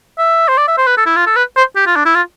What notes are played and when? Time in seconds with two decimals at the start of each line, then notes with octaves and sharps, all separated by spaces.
0.18 E5
0.48 C5
0.57 D5
0.68 E5
0.77 C5
0.87 B4
0.97 A4
1.06 E4
1.16 F4
1.26 A4
1.36 B4
1.56 C5
1.76 G4
1.86 F4
1.96 D4
2.05 E4
2.15 F4